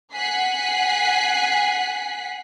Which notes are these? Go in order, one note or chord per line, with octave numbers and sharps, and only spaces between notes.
F#5 G#5 F#6 B6 C7